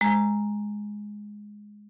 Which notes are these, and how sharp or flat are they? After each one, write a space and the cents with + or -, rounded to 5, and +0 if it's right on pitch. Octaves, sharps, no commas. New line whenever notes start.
G#3 +0 A#5 +0